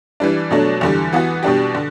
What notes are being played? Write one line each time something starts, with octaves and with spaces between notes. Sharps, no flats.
E3 G3 D4
B2 F#3 A3 D4
E2 D3 G3
E3 B3 F#4
B2 G3 D4 G4
D3